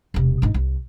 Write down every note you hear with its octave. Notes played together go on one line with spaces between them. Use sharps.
E1 C3
G#1 D#4
C2